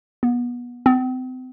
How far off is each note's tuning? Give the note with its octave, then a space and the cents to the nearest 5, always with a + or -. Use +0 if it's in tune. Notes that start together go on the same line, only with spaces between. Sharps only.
B3 -25
C4 -40